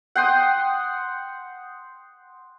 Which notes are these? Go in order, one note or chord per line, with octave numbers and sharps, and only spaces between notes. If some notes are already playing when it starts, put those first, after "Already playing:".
F#5 G5 C6 D#6